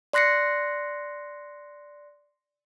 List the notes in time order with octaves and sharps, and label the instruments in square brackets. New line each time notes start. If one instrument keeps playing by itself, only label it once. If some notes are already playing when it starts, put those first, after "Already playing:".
[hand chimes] D5 C6 F#6 A#6 C7 C#7